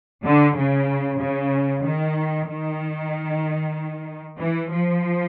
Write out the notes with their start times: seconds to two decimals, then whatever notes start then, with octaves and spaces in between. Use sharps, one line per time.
0.25 D3
0.56 C#3
1.20 C#3
1.84 D#3
2.48 D#3
4.38 E3
4.71 F3